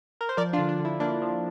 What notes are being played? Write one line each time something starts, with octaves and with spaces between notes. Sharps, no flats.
A#4
C5
F3 A#4 D5
D4 F4
D3
D4
D3
E4
A#3 D4
F3